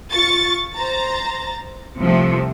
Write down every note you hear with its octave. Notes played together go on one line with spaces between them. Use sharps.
F4 C#6 A6
C5 A#5 A6
C2 C3 F3 A3